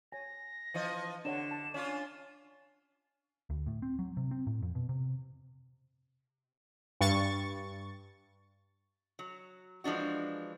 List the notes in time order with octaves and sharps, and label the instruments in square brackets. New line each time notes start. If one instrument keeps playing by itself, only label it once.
[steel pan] C#5 G#5 [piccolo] A#6
[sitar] E3 F3 D#5
[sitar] D3 [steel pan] D4 C#5 F#5 [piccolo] E7
[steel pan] A5
[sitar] C#4 D4 F4
[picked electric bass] D2
A2
C4
F#3
C3
C4
A2
F2
B2
C3
[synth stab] G2 C#6 A6
[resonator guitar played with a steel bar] F#3
E3 F3 G#3 D4 F#4